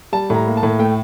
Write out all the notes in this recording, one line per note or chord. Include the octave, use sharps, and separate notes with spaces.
G3 A5
A2 A#5
A#3
A5
A2
A3 G5